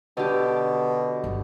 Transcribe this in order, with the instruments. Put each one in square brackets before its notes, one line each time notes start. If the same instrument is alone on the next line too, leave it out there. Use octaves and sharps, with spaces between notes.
[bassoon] B2 [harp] D3 G4
[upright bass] G1 D#3